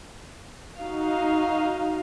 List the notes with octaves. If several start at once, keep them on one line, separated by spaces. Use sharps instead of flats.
D#4 F#4 F5